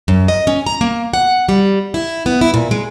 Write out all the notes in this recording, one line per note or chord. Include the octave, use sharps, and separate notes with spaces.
F#2
D#5
C#4
A#5
A#3
F#5
G3
E4
B3
E4
A#2
G#3